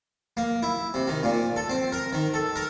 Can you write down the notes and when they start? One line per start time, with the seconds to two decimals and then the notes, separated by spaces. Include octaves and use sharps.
0.37 A#3
0.63 E4
0.94 C3
1.08 D#3
1.23 A#2
1.56 A4
1.69 C4
1.92 A#4
2.13 D#3
2.34 A4
2.56 A#4